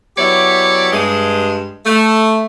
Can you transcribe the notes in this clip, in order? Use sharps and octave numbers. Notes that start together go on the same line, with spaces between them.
F#3 B3 E4 G4 C#5 D5
G2 G#3
A3